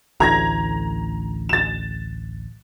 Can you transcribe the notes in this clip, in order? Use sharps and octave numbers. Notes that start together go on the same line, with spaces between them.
A1 D2 A2 A#5 G#6 A#6
A6 E7